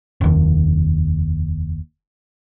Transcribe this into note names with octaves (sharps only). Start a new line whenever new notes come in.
F1 D#2